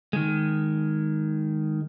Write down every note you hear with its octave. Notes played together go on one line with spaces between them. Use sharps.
D#3 G#3